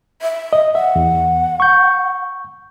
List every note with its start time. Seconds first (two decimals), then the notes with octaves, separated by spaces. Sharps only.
0.22 E5
0.53 D#5
0.75 E5 F#5
0.96 E2
1.60 C#6 G6